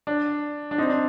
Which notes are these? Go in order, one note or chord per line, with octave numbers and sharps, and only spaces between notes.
D4
D4
C4 D#4
D4